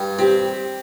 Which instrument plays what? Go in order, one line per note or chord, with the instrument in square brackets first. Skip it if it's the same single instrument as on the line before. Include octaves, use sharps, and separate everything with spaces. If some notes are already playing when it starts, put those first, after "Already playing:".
Already playing: [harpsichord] G2
[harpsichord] C4 [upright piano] G4